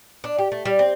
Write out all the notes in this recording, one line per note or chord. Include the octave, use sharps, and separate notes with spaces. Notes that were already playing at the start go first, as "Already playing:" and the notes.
D4
G4
A3
G3
C4